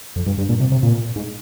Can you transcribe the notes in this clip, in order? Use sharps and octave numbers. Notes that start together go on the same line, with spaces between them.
F2
G2
G2
A#2
C3
C3
A#2
G#2